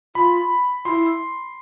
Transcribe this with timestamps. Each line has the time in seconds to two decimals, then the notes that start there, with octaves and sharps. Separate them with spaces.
0.15 F4 B5
0.85 E4 F4 C6